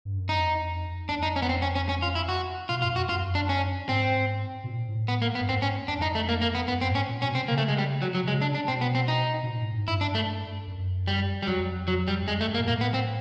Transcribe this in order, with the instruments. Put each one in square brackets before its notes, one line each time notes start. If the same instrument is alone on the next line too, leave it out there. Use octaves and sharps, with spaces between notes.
[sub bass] G2
F#2
[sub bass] F2 [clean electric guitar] D#4
[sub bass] F2 [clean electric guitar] D4
[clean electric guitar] D#4
C#4
B3
C4
C#4
C#4
C#4
F4
E4
F#4
[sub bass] B2 [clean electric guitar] F4
[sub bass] F#2 [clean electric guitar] F4
[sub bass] F2
[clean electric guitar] F#4
[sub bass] F#2 [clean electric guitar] F4
[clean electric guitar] D4
C#4
[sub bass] G#2 [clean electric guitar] C4
[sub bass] B2
A#2
A2
[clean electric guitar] B3
A#3
B3
[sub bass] G2
[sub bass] G#2 [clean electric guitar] C4
[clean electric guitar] C#4
[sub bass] F2 [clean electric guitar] D4
[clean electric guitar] D#4
A3
A#3
A#3
B3
[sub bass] F#2 [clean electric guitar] B3
[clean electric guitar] C4
[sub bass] G#2
[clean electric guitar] C#4
[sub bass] A#2
[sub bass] B2 [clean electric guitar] C#4
[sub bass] C3 [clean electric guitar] C4
[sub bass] C#3 [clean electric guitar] A#3
[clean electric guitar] A3
G#3
G3
F#3
F#3
[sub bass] C3
[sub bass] C#3 [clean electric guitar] G#3
[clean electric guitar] D4
D4
[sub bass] B2 [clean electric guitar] C4
[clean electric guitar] B3
C4
D#4
[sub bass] B2
A#2
A2
G#2
[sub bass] G2 [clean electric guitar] E4
[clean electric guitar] D4
A3
[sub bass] F#2
[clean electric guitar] G3
G3
[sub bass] F2 [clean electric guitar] F#3
[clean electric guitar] F#3
G3
[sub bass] F#2
[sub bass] F2 [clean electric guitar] G#3
[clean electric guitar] A3
[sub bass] F#2
[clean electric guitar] A#3
[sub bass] A#2
[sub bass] A2 [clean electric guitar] A#3
[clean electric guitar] B3
C4